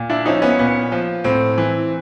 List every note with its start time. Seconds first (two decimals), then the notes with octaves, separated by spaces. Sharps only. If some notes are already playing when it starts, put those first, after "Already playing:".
Already playing: A#2
0.10 D4 E4
0.26 F3 C#4 D#4
0.42 B3 C#4
0.59 A#2 B3
0.92 F3
1.24 A2 C4
1.58 E3